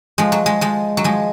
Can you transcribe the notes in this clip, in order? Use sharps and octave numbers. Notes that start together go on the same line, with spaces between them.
F3 G#3
F#3
G#3
F3 G#3
F#3
F3 G#3